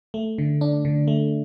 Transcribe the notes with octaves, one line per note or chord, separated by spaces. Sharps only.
A3
D3
D4
D3
A3